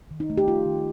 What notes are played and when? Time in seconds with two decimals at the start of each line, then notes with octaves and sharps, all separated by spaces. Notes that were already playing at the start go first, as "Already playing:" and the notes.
0.11 D#3
0.20 D#4
0.30 A3
0.38 G4
0.48 A3 F4
0.66 D#3